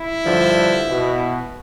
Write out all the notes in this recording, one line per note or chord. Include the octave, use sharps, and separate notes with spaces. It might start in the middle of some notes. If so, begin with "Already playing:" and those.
Already playing: E4
G2 D3 F3
B2